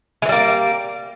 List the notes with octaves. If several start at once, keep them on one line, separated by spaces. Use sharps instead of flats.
E3 G3 G#3 A#3